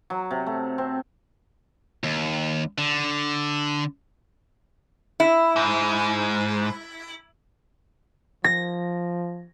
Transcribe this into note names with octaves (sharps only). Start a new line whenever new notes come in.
F#3
C3
A3
C4
D#2
D3
E4
G#2
F3 A#6